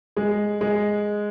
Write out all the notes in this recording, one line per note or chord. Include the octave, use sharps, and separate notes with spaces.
G#3
G#3